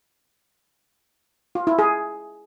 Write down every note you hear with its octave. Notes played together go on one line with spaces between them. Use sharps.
F4
E4
G#4